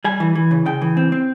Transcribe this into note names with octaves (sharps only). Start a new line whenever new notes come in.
G3 G#5
E3
E3
C#3
C#3 G5
E3
C4
C4